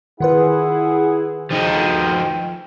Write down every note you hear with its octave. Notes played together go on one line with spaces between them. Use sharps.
D#3 E4 F4 G#4 B4 F#5
D2 F3 D#4 G#4 G5